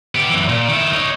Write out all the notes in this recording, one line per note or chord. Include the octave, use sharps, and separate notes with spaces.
B3 G4
F#2 E3
A#2
D#3 E4
D#4 C#5